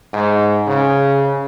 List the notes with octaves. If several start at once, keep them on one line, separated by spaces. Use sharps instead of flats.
G#2
C#3